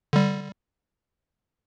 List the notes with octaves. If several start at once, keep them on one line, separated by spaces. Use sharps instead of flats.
D3 G3